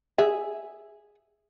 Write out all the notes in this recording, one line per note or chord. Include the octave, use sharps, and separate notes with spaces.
G#4 E5